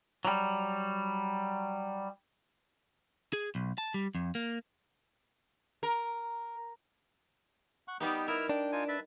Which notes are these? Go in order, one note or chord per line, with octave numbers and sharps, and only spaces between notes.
F#3 G3
G#4
B1
A5
G3
F2
A#3
A#4
F#5 C#6
G3 B3 D#4 G4
E4 A#4 E6 F6
D4 G5
D#4 F4 G#5
B4 E5 A5